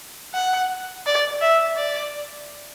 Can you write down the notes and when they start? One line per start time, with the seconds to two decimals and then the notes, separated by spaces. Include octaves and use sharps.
0.34 F#5
1.06 D5
1.41 E5
1.77 D5